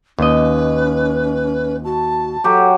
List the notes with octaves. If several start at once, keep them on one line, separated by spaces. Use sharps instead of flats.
D#2 C#4 B4 D#5
F#4 A5
F#3 G4 A4